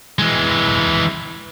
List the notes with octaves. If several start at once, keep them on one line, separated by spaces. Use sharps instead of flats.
E3 G#3